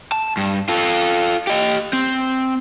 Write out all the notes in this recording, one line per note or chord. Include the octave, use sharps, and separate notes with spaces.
A5
G2
F4 A4
G4 D#5
C4